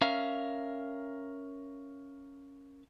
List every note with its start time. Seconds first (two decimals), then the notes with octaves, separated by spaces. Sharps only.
0.01 C#4 A#4 E5 F5